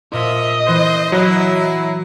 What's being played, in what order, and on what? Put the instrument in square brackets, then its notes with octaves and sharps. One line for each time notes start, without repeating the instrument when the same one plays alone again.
[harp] A#2 E7 [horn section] F3 A#3 E5 [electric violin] D#5
[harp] E3 B3 C7 [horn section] C5
[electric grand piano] F#3 [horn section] E4 [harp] E6 F#6